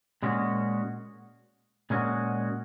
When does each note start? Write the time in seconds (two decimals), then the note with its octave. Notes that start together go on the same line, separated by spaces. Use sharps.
0.22 A#2 G#3 C#4 F#4
1.90 A#2 G#3 C#4 F#4